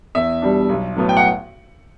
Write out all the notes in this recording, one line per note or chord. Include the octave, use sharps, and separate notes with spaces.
E2 E5
B2 G3 D4
B1
A2 F#3 B3
G5
F#5